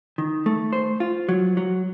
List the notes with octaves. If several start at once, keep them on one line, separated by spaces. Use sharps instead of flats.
D#3
A3
C5
F4
F#3
F#3